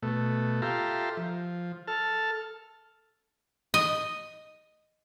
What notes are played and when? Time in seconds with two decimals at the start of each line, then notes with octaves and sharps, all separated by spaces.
0.02 B2 A3
0.62 F4 G4 A4 E5 A#5 C6
1.17 F3
1.88 A4 A5 F6
3.74 D#5